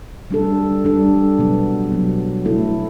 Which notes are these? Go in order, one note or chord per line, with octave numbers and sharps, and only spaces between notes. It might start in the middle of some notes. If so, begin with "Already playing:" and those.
G3 D4 A4
G3 D4 A4
B2 F#3 B3
B2 F#3 B3
A3 E4 A4